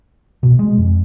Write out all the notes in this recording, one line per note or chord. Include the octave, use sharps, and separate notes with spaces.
B2
G#3
F2